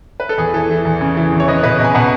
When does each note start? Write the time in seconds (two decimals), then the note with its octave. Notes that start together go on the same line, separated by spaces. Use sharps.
0.20 B4
0.29 A4
0.38 E2 G#4
0.54 E3 A4
0.70 E3
0.85 E2
1.01 C#3
1.17 E3
1.32 E2
1.40 C#5
1.48 C#3 B4 D#5
1.63 B2 B4 D#5
1.79 B2
1.84 G#5 B5
1.95 B2 F#5 A5